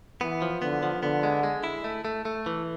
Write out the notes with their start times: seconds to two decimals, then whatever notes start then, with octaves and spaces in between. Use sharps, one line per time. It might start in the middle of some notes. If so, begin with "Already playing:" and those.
0.21 E3 B3
0.42 F3
0.62 D3 B3
0.83 F3
1.03 D3 B3
1.23 G#3
1.43 G#3
1.64 E4
1.84 A3
2.05 A3
2.25 A3
2.46 E3